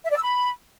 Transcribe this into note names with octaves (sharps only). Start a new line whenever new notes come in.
E5
D5
E6
B5